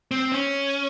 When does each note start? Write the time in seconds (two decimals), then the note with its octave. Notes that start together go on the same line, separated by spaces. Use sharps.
0.11 C4
0.32 C#4